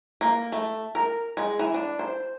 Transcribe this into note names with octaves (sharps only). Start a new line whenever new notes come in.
A#3
A3
A#4
G#3
E3
D4
C5